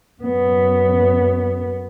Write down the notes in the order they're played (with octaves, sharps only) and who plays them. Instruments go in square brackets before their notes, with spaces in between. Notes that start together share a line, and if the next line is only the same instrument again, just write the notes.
[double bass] F#2 B3